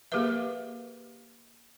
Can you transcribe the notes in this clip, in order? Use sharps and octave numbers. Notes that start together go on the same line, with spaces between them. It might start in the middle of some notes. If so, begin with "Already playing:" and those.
A#3 G4 G#4 A#4 B4 E5